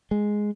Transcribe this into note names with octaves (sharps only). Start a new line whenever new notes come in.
G#3